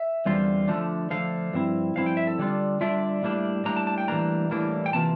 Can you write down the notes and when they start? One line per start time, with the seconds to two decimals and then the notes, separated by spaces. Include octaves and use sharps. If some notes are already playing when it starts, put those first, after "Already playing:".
Already playing: E5
0.25 E2 D3 G3 C4 F4
0.68 D3 F3 A3 D4
1.10 D3 F3 A3 D4 F5
1.53 G2 F3 C4 E4
1.95 G2 F3 C4 E4 F5
2.06 G5
2.17 E5
2.27 A4
2.38 D3 G3 D4 F4
2.81 D3 G3 D4 F4 E5
3.23 A2 G3 A#3 D4
3.65 A2 G3 A#3 D4 A#5
3.76 A5
3.87 A5
3.98 G5
4.08 A2 E3 G3 A#3 D4 A#5
4.51 A2 E3 G3 A#3 D4
4.86 G5
4.93 C3 E3 A#3 F4 A5